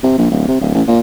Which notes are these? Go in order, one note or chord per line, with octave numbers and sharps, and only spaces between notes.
C3
A#1
D1
C3
D1
A1
A#2